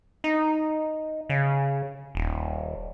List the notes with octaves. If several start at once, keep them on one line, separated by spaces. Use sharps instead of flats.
D#4
C#3
D#1